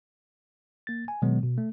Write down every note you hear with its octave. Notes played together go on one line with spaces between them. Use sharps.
A#3 A6
G#5
B2 D#3 F#3 G#3 B3
B2
A3